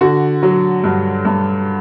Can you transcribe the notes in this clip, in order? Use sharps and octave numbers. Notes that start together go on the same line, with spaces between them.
D3 F#4
F#3
G2
G2